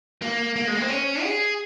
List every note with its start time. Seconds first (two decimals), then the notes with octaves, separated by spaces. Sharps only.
0.22 A#3
0.56 A#3
0.67 G#3
0.75 A#3
0.82 C4
0.89 C#4
1.22 G#4